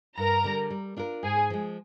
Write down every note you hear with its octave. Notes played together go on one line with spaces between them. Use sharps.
G2 A#4 A#5
D3 G3
G3
D4 F4 A#4
G#2 G#4 G#5
F3 G#3